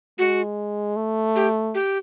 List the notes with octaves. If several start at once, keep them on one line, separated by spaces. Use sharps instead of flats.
G#3 F#4
A3
G4
G4